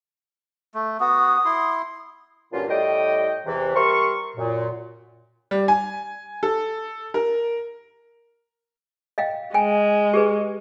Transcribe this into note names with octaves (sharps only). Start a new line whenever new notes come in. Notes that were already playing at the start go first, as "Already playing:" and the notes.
A3
B3 F#4 D#6
E4 C6
G2 A#2 D3 F#3 C#4 F4
A2 G3 D#5 G5
E2 C3 E3
G3 A#4 E5 C6 C#6
F#2 A#2
G3
G#5
A4
A#4
D#5 F5 G5
G#3 G5 G#5
G4 G#4 B4